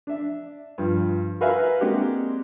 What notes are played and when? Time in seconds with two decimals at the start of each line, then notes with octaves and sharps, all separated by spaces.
0.07 D4 E5
0.78 G2 F3
1.41 F#4 A#4 B4 E5 F5 G#5
1.81 G#3 A#3 C4 D4 F#4 G4